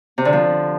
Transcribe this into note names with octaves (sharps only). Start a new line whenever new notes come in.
C3
D3
F3